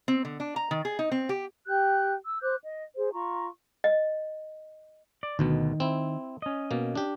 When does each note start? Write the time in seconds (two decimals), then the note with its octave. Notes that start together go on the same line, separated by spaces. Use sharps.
0.08 C4
0.25 D3
0.40 D4
0.56 A#5
0.71 D#3
0.85 G#4
0.99 D#4
1.11 C4
1.29 G4
1.67 G4 G5 F#6 G6
2.26 E6
2.41 C5 D6 F#6 G6
2.62 D#5
2.95 G#4 C5
3.13 F4 A#5 C#6
3.84 D#5
5.23 D5
5.39 D2 B2 D#3 B3
5.80 C4 E4
6.42 C#4 D#5
6.71 B2 A#3
6.95 D4 G4